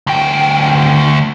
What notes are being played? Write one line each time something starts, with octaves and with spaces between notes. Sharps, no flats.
D2 G5